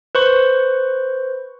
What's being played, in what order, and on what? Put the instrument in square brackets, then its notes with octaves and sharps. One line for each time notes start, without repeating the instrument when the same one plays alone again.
[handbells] B4 C5 C#6